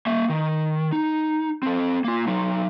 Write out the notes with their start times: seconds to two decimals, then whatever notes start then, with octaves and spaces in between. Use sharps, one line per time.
0.07 A#3 E5
0.30 D#3
0.92 D#4
1.63 C4 A4
2.04 A#3 F4
2.27 F#3 D#4